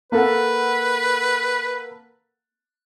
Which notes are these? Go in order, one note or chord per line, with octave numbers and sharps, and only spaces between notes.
A#3 A4 B4 F#5